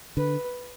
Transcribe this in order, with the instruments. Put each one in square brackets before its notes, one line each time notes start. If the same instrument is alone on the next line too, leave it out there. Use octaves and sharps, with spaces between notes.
[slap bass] D3 [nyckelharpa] B4